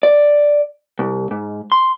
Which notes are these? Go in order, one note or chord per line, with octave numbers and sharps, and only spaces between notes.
D5
C2
G#2
C6